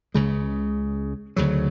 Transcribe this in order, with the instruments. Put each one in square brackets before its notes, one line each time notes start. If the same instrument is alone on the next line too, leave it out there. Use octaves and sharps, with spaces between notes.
[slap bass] C#2 C#3 G#3
D2 C#3 F#3